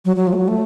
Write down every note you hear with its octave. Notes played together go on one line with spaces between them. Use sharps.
F#3
F#3
F3
A3
F#3
A3